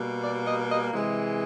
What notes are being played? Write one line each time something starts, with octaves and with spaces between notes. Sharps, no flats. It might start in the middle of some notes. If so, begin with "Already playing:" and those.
Already playing: B2 G3 A#3
D5
D#5
D#5
C3 E3 G#3